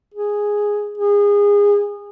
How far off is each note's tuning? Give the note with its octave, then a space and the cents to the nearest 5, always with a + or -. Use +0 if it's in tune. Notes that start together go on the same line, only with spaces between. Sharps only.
G#4 -5
G#4 -25